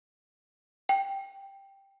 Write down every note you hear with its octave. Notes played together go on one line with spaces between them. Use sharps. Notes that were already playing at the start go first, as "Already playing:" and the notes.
G5